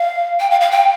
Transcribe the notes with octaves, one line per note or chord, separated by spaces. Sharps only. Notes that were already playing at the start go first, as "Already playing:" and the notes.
Already playing: F5
G5
F5
F5
G5